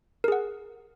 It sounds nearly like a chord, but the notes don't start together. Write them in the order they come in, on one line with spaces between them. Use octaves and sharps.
A#4 G#4 F#5